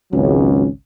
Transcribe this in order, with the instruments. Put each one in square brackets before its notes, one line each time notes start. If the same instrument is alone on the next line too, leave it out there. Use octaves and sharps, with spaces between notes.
[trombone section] G#1 C#2 F#3 C#4